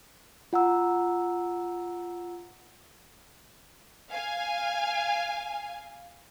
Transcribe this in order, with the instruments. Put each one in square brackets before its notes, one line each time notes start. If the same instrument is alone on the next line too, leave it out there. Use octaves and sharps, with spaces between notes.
[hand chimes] F4 F#5 A#5 E6
[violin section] F5 G#5